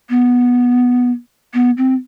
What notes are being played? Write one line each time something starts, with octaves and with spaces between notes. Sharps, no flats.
B3
B3
C4